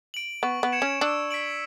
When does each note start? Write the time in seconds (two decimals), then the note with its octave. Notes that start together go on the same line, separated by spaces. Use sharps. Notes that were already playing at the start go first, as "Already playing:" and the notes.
0.14 D7 F#7
0.43 B3 C#6
0.63 B3
0.72 G#6 C#7 E7
0.82 C#4
1.01 D4 E6
1.31 B6 D7 F#7